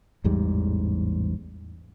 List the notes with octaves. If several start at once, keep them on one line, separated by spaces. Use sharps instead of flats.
A1 E2 G#2 G3